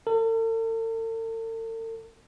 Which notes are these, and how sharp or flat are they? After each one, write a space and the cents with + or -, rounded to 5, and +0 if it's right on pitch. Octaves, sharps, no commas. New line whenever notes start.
A4 +45